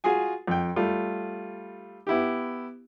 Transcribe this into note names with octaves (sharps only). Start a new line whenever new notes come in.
F4 F#4 G#4 G#5
F2 G5
G3 A3 F4
B3 E4 G4